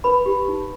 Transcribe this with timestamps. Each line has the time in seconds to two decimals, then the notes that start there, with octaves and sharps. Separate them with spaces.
0.04 B4 B5
0.26 G4
0.48 D#4